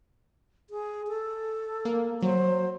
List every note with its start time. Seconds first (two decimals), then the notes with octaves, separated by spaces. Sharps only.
0.70 G#4
1.08 A4
1.85 A#3
2.22 F#3 C5